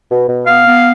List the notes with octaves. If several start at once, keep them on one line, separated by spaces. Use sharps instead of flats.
B2
B2
B3 F5
B3